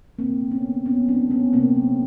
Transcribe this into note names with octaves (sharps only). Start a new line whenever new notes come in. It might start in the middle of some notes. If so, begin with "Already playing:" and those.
D3 A#3 C4
A3
B3 C#4
A3
A3 B3 C#4
F#3 C4 D4
A3 B3 C#4
C3 A#3 C4
F#3